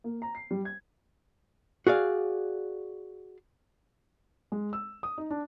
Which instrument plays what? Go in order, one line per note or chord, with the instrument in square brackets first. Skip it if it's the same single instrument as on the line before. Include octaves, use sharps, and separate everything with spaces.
[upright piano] A#3
A#5
C7
G3
G#6
[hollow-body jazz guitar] F#4 G#4 D5 F5
[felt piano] G#3
E6
D#6
D#4
D4